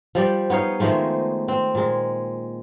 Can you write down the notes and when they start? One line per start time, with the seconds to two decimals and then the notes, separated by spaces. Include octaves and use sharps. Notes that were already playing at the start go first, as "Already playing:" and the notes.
0.15 F3 G3 D5
0.50 B3 D#4 C#5 F5
0.80 D#3 F3 G#3 A3
1.48 C4
1.75 A#2 G#3